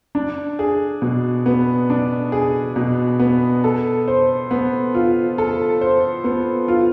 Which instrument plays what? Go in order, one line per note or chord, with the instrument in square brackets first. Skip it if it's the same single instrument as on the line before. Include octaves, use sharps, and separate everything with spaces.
[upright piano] D4
G#4
B2
B3
D4
G#4
B2
B3
A4
C5
B3
F4
A4
C5
B3
F4